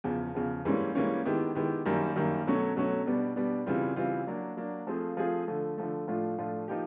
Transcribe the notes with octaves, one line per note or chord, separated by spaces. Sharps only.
E2 C#3 F3
E2 C#3 F3
G#2 E3 G3 A#3 C#4
G#2 E3 G3 A#3 C#4
D#3 G#3 B3 E4 G4
D#3 G#3 B3 E4 G4
F#2 D#3 G3 A#3
F#2 D#3 G3 A#3
B2 F#3 A3 C#4
B2 F#3 A3 C#4
B2 G3 B3 D4
B2 G3 B3 D4
C#3 E3 G3 C4 F4
C#3 E3 G3 C4 F4
F#3 A#3 D4
F#3 A#3 D4
F3 A3 C4 F4 G#4
F3 A3 C4 F4 G#4
D3 F3 A3
D3 F3 A3
A2 F3 A3 D4 F4
A2 F3 A3 D4 F4
F3 A#3 D#4 G4